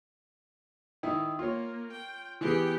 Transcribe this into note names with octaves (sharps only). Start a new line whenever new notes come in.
D#3 D#4 E4
A#3 F4 C#5
G5
E3 B3 G4 G#4 G5